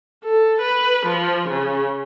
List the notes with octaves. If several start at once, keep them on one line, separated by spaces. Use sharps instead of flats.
A4
B4
F3
C#3